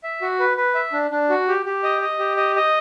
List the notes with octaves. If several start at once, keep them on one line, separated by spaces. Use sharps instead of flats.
E5
F#4
B4
B4
E5
D4
D4
F#4
G4
G4
D#5
D#5
G4
D#5
D#5